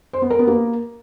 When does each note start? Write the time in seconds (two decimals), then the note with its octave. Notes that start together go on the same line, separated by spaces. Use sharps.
0.13 C5
0.22 B3
0.30 A#4
0.39 B3
0.48 A#3